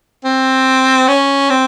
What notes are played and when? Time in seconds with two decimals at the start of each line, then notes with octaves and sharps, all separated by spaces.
0.24 C4
1.08 C#4
1.50 C4